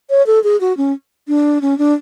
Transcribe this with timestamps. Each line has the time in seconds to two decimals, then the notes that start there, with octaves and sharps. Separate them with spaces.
0.10 C#5
0.26 A4
0.44 G#4
0.61 F#4
0.77 C#4
1.28 D4
1.62 C#4
1.78 D4